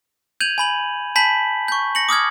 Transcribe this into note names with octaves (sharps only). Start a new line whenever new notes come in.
G6 G#6 D#7 F7 F#7
G#5 B5 F#7
G#5 A5 B5 G6 B6 F#7
C#6 G6
A#6 C#7 F#7
D6 D#6 F6 G#6